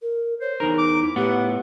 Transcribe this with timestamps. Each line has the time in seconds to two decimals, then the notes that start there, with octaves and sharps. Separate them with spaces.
0.02 A#4
0.41 C5 C#5
0.60 E2 D#4 A#4
0.78 D6
1.02 E4
1.16 A2 B3 G4 F#5